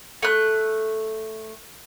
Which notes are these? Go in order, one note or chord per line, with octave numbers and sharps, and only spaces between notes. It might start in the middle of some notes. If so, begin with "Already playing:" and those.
A3 F#6